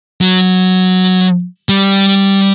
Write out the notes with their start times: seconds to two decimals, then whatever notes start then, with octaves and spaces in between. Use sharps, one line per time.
0.21 F#3
1.69 G3